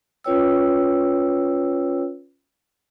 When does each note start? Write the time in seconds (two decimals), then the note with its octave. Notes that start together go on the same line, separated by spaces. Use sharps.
0.24 C#4 F4 B4 C#5 G5 E6